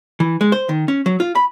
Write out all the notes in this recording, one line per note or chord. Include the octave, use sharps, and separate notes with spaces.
E3
G#3
C5
D#3
C#4
F#3
F4
B5